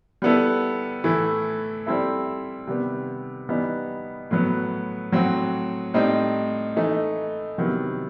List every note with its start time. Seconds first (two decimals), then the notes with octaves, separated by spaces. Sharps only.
0.22 G3 B3 E4 A4
1.04 A2 E3 A3 E4
1.86 G3 C4 E4 A4 E5
2.67 C3 D#3 G3 B3
3.49 E3 G3 B3 D#4
4.31 A2 F#3 B3
5.12 A2 F#3 C4 F#4
5.94 A2 G3 C4 D#4
6.76 E3 A3 D#4
7.58 C3 D#3 F#3 B3 E4